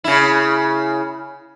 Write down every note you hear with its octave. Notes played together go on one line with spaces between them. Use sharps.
C#3 E4